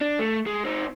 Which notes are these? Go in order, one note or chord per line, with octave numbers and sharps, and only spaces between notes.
D4
A3
G#3
C4 D#4